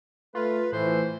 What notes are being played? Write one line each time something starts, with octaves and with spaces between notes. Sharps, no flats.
A3 F4 B4
A2 E3 C5